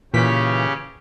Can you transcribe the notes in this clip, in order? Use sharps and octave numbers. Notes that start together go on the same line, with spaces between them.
A#2 C#3 E3 C#4 G4 B6